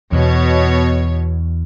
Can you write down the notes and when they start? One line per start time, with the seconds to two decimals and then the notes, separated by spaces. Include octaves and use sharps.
0.12 E2 B2 C#5